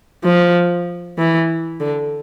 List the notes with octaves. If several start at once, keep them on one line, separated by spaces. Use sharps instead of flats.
F3
E3
D3